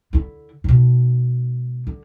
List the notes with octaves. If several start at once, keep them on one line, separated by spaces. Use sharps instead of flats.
D3 E4
G#2 B2
D3